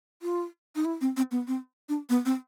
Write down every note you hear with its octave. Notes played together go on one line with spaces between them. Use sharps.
F4
D#4
E4
C4
C4
B3
C4
D4
B3
C4